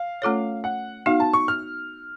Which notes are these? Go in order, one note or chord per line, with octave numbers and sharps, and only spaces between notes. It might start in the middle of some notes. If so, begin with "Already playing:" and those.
Already playing: F5
A3 C#4 F4 A4 C#5
F#5
B3 D#4 F#4 F5
A5
C#6
F6